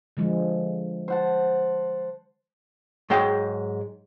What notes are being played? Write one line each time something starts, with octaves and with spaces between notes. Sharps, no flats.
D3 F3 G#3
C5 F#5 A5
G#2 F#3 G#3 G5